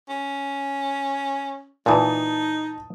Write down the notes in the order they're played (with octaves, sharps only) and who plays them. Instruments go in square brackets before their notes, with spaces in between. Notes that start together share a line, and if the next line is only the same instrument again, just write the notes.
[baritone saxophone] C#4
[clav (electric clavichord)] A#2 E3 [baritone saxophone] D#4 [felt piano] A5 D#6